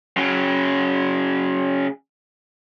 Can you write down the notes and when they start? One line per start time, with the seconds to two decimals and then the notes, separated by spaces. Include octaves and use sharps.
0.17 C#3 F#3